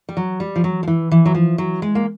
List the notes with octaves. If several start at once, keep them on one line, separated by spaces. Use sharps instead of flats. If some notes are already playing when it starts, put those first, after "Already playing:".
G3
F#3
G3
F3
F#3
F3
E3
E3
F#3
F3
F#3
G#3
A#3